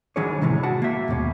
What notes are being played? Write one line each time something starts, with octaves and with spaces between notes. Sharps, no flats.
D#3 F#3 C#4 D4 G#4 C#5
A2 C3 E3 G#3
F#4 F#5 A5
A#3 E5
D#2 G#2 B2 C#4